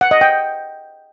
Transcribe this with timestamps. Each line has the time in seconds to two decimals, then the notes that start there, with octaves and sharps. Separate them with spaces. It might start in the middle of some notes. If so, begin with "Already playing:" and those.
0.01 F#5
0.11 D#5
0.21 G5